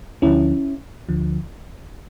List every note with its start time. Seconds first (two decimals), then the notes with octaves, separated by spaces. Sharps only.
0.22 D2 D3 F3 C#4 E4
1.09 D2 D3 F3